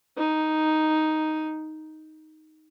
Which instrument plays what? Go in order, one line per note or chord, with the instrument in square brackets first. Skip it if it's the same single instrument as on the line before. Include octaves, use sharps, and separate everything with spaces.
[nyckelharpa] D#4